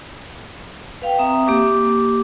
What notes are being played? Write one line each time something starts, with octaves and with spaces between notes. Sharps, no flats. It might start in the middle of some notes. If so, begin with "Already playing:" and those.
B4 F5 G5
C4 E5 A#5 D#6
A#3 G4 D6